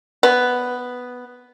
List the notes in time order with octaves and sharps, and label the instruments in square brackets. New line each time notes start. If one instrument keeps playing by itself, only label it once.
[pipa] B3